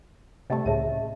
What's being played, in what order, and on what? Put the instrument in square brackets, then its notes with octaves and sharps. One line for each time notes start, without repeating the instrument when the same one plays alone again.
[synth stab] C3 G3 A3 [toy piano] D#5
[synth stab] C#2 A2 C#3 [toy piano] E5 A5